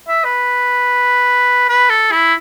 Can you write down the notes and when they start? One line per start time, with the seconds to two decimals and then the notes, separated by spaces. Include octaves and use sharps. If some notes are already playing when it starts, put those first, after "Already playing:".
0.08 E5
0.24 B4
1.69 B4
1.89 A4
2.11 E4